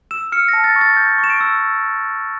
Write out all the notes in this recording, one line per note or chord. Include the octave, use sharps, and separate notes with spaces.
E6 E7
F6 C#7
A5 A#6
A6
C#6
A6
G6
C#6
E7
D7
E6